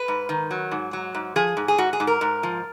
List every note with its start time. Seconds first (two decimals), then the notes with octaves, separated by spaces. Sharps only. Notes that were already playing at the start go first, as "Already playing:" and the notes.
Already playing: B4
0.08 G#2
0.29 D#3
0.51 F#3
0.71 G#2
0.93 F#3
1.15 G#2
1.36 F3 G#4
1.57 G#2
1.68 G#4
1.78 G#2 F#4
1.93 G#4
2.00 G#2
2.07 A#4
2.21 G#2
2.43 F3